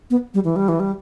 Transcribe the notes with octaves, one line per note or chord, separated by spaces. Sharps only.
B3
G3
E3
G3
E3
G3